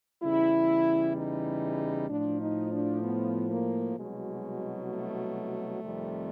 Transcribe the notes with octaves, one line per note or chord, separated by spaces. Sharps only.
E2 C#3 E3 G3 E4
D#4
A2 F3 D4
D#4
D4
B3
A#3
C2 B2 F#3 G#3
A3
F2 C3 D#3 G3